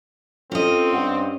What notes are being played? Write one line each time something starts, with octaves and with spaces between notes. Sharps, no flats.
C4 C#4 F4 A4 D#5
G2 F#5